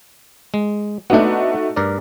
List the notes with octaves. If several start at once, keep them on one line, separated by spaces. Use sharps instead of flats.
G#3
A3 B3 D4 D#4 F#4
G2 A#4 D5